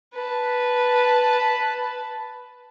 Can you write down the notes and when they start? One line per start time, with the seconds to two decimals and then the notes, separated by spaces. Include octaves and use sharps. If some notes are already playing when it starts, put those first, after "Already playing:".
0.14 B4 A5